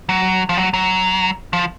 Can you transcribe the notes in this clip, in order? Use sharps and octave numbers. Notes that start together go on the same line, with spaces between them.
F#3
F3
F#3
F#3
F3